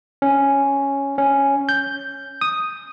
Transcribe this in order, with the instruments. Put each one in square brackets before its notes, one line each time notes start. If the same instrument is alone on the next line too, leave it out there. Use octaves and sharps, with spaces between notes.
[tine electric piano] C#4
C#4
G6
D#6